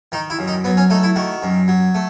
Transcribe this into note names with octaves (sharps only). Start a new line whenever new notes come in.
D#3 D#4
E4
F#2
D#4
F#3 B3
C#4
A3 D#4
E4
D#3 F#4
F#2
F#3
A3